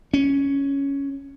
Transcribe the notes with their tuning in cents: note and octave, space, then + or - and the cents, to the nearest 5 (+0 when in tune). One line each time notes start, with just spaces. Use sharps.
C#4 +5